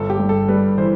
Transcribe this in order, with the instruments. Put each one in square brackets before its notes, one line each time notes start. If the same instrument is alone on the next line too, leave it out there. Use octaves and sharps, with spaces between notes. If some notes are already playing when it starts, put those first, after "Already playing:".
Already playing: [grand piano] G1 A4
G4
G2
A4
G3 B4
E3 C5